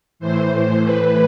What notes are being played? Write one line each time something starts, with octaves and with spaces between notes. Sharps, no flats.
A2 E3 C5
C5
B4